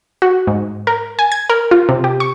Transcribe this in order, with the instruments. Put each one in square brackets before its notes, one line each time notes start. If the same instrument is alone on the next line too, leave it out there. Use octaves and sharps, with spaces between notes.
[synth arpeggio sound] F#4
G#2
A#4
G#5
G#6
A#4
F4
C3
G4
C#6